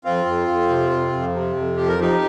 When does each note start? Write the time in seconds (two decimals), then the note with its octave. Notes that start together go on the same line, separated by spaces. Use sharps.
0.04 F2 C4 F4
0.26 F2
0.48 F2
0.69 C3
0.90 F2
1.13 F2
1.33 C3
1.56 F2
1.77 F3 G4
1.88 A#4
1.99 F3 D#4 G4